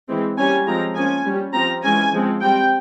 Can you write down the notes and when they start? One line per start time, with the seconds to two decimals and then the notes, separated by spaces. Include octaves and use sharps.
0.09 E3 G#3 C4
0.38 G3 A#3 C#4 G#5
0.67 F3 G#3 C4 A#5
0.96 F3 A#3 C#4 G#5
1.25 G3 C#4
1.54 F3 C4 A#5
1.84 E3 G#3 C#4 G#5
2.13 F3 G#3 C4
2.42 G3 C4 G5